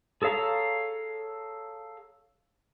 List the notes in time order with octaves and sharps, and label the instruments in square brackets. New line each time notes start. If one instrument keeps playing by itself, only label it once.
[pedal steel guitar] G#4 A4 C#5 F5 A#5